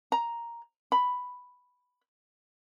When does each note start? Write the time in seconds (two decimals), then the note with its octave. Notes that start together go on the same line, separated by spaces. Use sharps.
0.12 A#5
0.92 B5